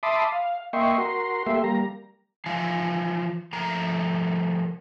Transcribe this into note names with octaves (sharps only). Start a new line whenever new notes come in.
E5 A5 B5 C6 D6 D#6
F5
A#3 D#5 E5 G5 C6 C#6
F#4 A#4 C6
A3 A#3 G4 E5 C6
G3 A#3 A#5
E3 F3 F4 F5 G#5
F3 A3 A#4 A#5